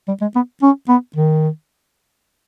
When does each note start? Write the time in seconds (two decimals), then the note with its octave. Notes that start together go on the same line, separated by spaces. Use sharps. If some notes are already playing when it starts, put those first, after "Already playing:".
0.08 G3
0.21 G#3
0.35 B3
0.62 C#4
0.88 B3
1.16 D#3